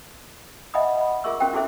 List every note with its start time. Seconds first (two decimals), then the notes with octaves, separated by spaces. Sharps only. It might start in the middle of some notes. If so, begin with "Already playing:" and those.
0.74 D#5 E5 F#5 G#5 B5 D#6
0.98 F#5 B5
1.24 F4 G#4 A#4 E5 C#6 E6
1.40 C#4 F#4 A#4 C5 G5
1.53 E4 F#4 G#4 A4 C5 E5